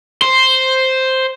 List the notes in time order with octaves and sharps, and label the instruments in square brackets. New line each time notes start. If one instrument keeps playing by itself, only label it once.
[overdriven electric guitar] C5